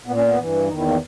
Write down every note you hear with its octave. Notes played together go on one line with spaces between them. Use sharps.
A#2 B3
C#4
B3
G2 E3
E2 D#3 D#4
E4
A#3